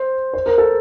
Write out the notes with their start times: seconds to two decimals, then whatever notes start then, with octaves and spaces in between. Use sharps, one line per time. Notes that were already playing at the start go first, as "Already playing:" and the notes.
Already playing: C5
0.33 C5
0.46 A#4
0.58 A4